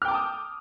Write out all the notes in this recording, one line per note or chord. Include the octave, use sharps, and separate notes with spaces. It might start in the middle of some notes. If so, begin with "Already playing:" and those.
G5 A5 D6 D#6 F6